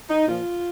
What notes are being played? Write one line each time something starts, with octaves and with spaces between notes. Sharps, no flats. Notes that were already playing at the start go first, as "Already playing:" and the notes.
D#4
A#2 F3 F4